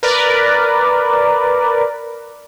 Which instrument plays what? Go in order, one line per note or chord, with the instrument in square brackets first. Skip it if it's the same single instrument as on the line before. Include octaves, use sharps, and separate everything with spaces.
[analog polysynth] A#4 B4 D5